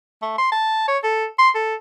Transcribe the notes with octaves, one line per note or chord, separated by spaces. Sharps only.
A3
C6
A5
C#5
A4
C6
A4